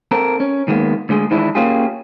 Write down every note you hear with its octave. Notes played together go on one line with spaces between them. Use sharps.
C4 A4 A#4
C#4
D#3 G#3 A#3 B3
D2 D3 G#3 G#4
D#3 E3 G#3 D4 E4
A#3 C#4 F4 G4 G#4